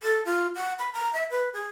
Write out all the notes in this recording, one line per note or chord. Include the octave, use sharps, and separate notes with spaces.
A4
F4
F#5
B5
A#5
E5
B4
G#4